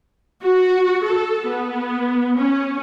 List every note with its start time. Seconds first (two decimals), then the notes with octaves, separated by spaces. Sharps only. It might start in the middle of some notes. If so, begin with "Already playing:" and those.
0.43 F#4
1.05 A4
1.48 B3
2.37 C#4